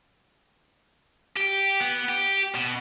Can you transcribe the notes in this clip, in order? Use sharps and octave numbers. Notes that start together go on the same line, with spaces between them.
G4
B3
G4
B2